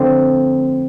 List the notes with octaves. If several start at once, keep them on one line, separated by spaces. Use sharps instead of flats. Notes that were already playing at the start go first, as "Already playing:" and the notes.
Already playing: F2 D3 A3 C4